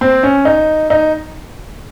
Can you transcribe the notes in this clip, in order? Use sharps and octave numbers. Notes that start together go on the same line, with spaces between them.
C4
C#4
D#4
D#4